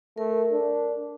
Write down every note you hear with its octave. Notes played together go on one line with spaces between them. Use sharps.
A3 A#4
D4